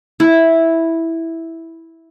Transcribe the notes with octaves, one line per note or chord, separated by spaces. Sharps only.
E4